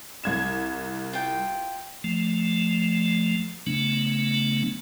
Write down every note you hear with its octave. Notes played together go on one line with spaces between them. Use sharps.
C2 G#6 E7
F4 G5
F3 A3
C#3 F#3 A3 B3 D4